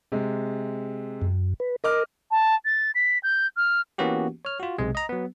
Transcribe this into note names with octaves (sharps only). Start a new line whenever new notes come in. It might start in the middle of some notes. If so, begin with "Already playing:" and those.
C3 G#3
F#2
B4
A#4 D#5 D6 F6
A5
A6
B6
G6
F6
E3 A#3 B3 C#4 F#4 G4
C#5 F6
F4 F#4
B1 C3 G#3
D#5 A#5
F#3 B3